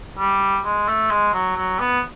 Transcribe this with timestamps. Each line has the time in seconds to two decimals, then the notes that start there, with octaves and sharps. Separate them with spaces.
0.18 G3
0.65 G#3
0.88 A3
1.11 G#3
1.33 F#3
1.57 F#3
1.79 B3